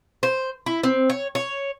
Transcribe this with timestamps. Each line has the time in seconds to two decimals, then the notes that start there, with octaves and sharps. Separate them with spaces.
0.23 C5
0.66 E4
0.84 C4
1.10 C#5
1.35 C#5